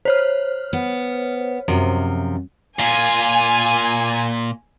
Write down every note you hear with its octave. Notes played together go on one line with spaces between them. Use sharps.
C5 C#5 F6
B3
F#2 C3 F3
A#2 F4 G#5